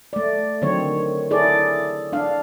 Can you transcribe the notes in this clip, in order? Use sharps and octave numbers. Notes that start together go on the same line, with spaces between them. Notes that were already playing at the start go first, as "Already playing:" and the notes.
A3 D5
D3 D#3 F#3 C4 C#5
E4 G#4 A4 D5
D4 F5